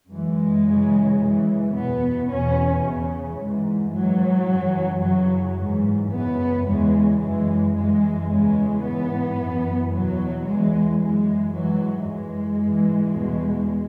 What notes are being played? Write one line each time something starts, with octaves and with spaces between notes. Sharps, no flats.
F#2 E3 G#3
F#2 C#3 E3
F#2 C#3 E3
E2 B2 B3
E2 B2 C#4
E2 C#3 E3
G#2 E3
G#2 E3 F#3
F#2 C#3 E3
F#2 C#3 E3 F#3
G#2 E3
F#2 C#3 E3 B3
E2 C#3 E3 G#3
F#2 E3 G#3
F#2 E3 G#3
E2 C#3 E3 G#3
G#2 E3 B3
F#2 E3
E2 B2 F#3
E2 E3 G#3
F#2 E3 G#3
G#2 E3 F#3
F#2 E3 G#3
G#2 E3
E2 B2